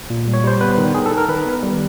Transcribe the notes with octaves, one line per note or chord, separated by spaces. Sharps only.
A#2
G3
C#5
G3 C5
B3 B4
D#3
D#3 G#4
A4
D#3
A#4
D#3 B4
B3
G3